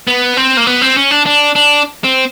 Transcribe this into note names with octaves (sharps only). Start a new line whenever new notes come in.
B3
C4
A#3
B3
C4
C#4
D4
D4
D4
C4